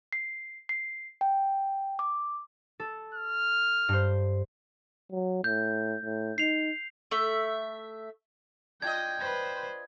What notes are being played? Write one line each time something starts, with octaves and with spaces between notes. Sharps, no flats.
C7
C7
G5
D6
A4
F6
G2 C5
F#3
A2 G6
A2
D#4 C7 F7
A3 E5
D4 F4 D#5 G5 G#6
B4 C5